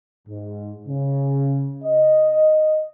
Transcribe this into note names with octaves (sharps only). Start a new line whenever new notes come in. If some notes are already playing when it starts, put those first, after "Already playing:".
G#2
C#3
D#5